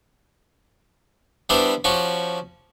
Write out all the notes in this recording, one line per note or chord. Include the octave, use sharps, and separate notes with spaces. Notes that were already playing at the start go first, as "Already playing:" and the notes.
G3 B3 D4 E4 G4 C5
F3 C#4 F#4 G4